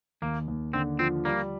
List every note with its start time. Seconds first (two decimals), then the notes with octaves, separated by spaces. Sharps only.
0.22 D#2 A#3
0.48 D#2
0.73 D3 C4
0.99 F3 C4
1.25 G3 A#3